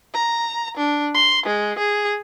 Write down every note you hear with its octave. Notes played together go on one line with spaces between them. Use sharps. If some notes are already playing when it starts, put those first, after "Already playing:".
A#5
D4
C6
G#3
G#4